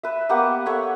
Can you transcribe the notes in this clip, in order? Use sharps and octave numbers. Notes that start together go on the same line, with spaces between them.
B4 E5
A#3 B3 G4 F#5
A4 C#5 E5 F#5